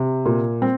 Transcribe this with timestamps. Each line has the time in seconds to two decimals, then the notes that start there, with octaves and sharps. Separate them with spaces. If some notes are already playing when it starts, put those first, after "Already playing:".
Already playing: C3
0.26 A#2
0.62 C4